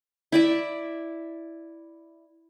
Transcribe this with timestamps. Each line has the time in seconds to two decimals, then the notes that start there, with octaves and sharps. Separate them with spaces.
0.32 E4 D5 E5